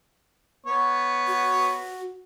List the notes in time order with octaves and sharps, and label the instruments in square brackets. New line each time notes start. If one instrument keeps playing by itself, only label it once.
[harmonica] B3 C#5
[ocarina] F#4